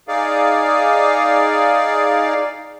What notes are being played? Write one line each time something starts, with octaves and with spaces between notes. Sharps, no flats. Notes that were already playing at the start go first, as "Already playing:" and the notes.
D#4 G#4 D5 F5